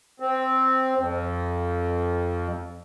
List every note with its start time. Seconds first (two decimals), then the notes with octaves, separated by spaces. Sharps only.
0.20 C4
0.99 F2